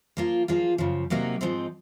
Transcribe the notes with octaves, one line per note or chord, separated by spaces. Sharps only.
F3 A#3 F4
F3 A#3 F4 G#4
F#2 C#3 F3
C3 F#3 A#3 D#4 F#4
G#2 F3 C4 D#4